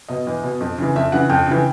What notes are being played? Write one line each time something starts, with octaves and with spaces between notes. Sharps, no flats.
B2 D#5
E2
B2
F2
C#3 E3
F2 E5
C#3 E3 F#5
F2 G5
C#3 E3